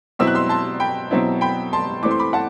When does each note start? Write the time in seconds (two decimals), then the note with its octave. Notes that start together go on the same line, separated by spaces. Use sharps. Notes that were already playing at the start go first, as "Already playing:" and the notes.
0.19 B2 F#3 C4 E4 E6
0.27 F#6
0.35 C6 E6
0.49 A5 C6
0.80 G5 B5
1.11 B2 F#3 C4 E4
1.41 G5 B5
1.73 A5 C6
2.02 E3 A3 C4 D6
2.11 C6
2.20 B5 D6
2.33 F#5 A5